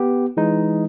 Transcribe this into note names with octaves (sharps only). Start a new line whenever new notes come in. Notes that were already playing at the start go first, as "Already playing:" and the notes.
Already playing: B3 G4
E3 G#3 D#4